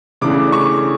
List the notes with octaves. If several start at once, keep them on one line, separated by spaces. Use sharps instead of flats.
C#3 E3 A3 D4 D6
C#6